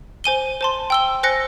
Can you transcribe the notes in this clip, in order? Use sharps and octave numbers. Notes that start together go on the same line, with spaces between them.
C5 G#5 D#7 G7
C5 A5 C6
G5 E6 G7
C5 G#5 F#6 A#6 C#7